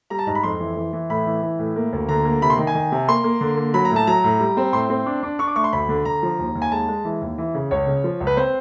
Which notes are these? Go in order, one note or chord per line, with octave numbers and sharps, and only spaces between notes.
G3 A#5
A5
G#2 A#5
B5
F2 C6
E3
E3
E3
A2 B5
E3
E3
A2
A#3
D2
D3 A#5
A#3
C3 B5
C6
D#3
G#5
D#3
C3
A#3 C6
A#3
D3
A#3
F#3 B5
A#5
A2
A5
F#3 A#5
A2
G3
C4
A2 C6
C4
D4
D4
D4 C#6
D6
A3 C#6
C6
D2 B5
D3
D3 A#5
F3
D#2
D#2
G#5
G#3 A5
G#3
E3
D#2
E3
C#3
C#2 C#5
C#3
F3
C#2
B4
C4 C5